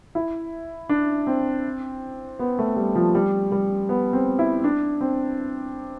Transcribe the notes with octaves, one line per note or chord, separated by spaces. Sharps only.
E4
D4
C4
B3
A3
G3
F3
G3
G3
B3
C4
E4
D4
C4